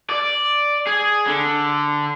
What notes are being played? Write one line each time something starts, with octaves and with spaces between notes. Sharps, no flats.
D5
G#4
D3